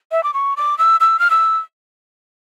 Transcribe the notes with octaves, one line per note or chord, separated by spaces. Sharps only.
E5
D6
C#6
D6
E6
E6
F6
E6